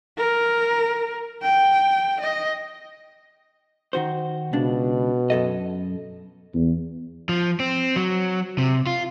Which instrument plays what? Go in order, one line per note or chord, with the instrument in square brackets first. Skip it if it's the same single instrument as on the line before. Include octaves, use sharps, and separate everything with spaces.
[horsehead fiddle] A#4
G5
D#5
[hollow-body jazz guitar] D#3 F#4 C5
[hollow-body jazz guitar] C#2 D4 [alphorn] B2
[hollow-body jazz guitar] F#2 A4 D#5
[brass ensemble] E2
[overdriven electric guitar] F3
C4
F#3
C3
F4